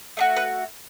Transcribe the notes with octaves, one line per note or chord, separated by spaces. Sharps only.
A3 D4 F#4
B4